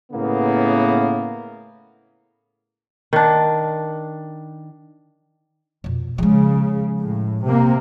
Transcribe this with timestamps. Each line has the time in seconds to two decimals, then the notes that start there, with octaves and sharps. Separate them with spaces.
0.12 A2 C#3 A#3 B3
3.13 D#3 D4
5.84 F2 B2
6.18 C#3 F3 G#3
7.00 A2
7.45 C3 A#3